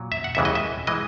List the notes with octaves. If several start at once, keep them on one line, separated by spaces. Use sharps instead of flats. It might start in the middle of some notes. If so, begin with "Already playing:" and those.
Already playing: A#2 F#3
E5
F#5
D#2 C#3 E3 G#3 E5
D#5
E5
E3 G#3 D#5